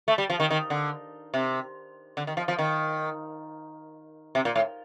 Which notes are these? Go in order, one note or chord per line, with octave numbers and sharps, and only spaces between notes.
A3
G3
F3
D#3
D#3
D3
C3
D3
D#3
F3
F3
D#3
C3
A#2
A2